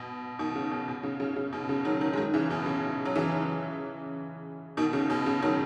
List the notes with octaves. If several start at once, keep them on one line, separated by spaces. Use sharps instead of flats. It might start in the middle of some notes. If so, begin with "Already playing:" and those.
Already playing: B2
B2 D#3
C#3
B2
B2
C#3
C#3
C#3
B2
C#3
D#3 F#3
D#3 F#3
G#3
D#3 F#3
C#3 E3
B2
C#3
F#3
C#3 E3
B2 D#3
C#3
B2
C#3
D#3 F#3